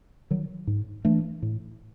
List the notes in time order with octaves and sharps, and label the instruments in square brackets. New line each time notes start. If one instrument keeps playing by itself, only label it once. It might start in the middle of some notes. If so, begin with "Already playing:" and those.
[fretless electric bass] D#3 F#3
G#2
E3 A3 D4
A2